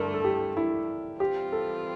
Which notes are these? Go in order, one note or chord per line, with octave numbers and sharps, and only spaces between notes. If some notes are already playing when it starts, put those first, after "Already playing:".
Already playing: G2 D3 A3 A#4 D5
A4
G4
E4
E3 G3 C4 F4 G4
A4